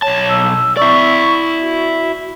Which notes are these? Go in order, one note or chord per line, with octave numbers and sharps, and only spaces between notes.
B1 C#5 A5
E6
E4 D5 C#6
F#4